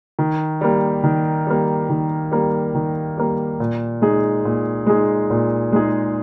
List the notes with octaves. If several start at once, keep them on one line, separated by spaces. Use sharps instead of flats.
D#3
G3 A#3
D#3
G3 A#3
D#3
G3 A#3
D#3
G3 A#3
A#2
G#3 D#4 G#4
A#2
G#3 D#4 G#4
A#2
G#3 D#4 G#4